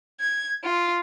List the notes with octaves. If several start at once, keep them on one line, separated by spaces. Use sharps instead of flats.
G#6
F4